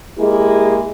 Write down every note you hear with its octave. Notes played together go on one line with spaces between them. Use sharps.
G#3 A#3 E4 G4 G#4